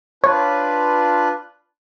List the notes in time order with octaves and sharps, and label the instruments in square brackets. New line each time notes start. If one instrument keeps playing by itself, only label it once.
[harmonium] D4 F4 B4 [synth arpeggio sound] C#5